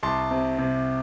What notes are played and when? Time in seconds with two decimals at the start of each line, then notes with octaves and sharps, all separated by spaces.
0.03 C2 A5 C6
0.31 C3
0.58 C3